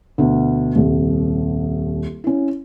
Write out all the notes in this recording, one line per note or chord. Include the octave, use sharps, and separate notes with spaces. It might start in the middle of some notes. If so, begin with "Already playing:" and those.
D2 B2
D#1 C2
C#4 E4